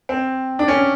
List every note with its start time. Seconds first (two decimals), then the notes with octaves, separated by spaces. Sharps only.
0.09 C4
0.59 D4
0.68 C#4